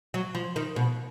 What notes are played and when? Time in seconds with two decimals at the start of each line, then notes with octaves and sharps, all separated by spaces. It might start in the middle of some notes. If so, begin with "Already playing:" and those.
0.14 F#3
0.35 F3
0.56 D#3
0.76 B2